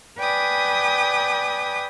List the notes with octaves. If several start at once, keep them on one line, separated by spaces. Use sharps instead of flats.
B4 D5 G5 G#5 D#6